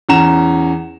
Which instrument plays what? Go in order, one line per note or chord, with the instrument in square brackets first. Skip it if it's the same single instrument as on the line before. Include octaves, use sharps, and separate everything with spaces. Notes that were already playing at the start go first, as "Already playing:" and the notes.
[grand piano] E2 C#4 A#5 E7